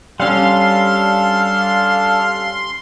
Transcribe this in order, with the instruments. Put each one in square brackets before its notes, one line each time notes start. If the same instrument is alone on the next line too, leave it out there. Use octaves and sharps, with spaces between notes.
[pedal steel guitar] G3 C#4 [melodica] D4 A4 [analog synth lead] F5 [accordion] C6